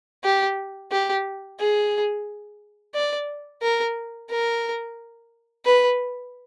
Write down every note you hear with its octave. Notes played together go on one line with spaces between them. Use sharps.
G4
G4
G#4
D5
A#4
A#4
B4